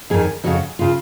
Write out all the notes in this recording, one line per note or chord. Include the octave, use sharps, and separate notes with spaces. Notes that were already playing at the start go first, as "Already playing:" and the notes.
F2 D#3 G#4
F2 C#3 F#4
C#3 F4